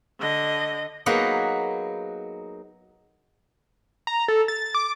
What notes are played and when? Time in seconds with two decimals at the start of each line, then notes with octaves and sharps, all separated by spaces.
0.20 D3 D#5
1.06 F#3 A#3 B3 D#4 G#4 B4
4.07 A#5
4.28 A4
4.48 A6
4.75 D6